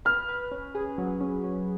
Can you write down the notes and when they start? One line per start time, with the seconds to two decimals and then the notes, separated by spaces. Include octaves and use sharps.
0.05 B4 F6
0.29 B4
0.52 C#4
0.75 G#4
0.98 F#3
1.20 C#4
1.44 C#4